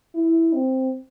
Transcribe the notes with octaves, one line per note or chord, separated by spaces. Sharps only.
E4
C4